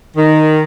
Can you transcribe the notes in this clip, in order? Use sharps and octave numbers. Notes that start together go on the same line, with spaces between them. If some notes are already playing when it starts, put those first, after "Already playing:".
D#3